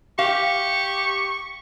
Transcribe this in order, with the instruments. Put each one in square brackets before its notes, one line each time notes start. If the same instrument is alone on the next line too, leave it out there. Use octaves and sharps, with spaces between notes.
[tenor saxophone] G4 [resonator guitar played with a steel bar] F5 [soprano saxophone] C#6